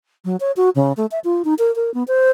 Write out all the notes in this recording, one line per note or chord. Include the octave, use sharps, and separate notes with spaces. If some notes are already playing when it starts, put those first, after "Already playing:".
F#3
C#5
F#4
C#3
A3
E5
F4
D#4
A#4
A#4
B3
C5